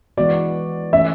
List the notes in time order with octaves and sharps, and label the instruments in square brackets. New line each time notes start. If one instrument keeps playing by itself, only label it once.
[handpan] E3 G#3 B3 F#4 [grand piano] D5
[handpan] E3 A3 C#4 [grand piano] E5